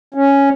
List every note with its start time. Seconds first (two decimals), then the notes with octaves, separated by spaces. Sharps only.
0.14 C#4